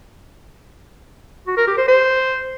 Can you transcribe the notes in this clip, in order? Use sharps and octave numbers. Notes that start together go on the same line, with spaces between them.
F#4
A#4
G4
C5
C5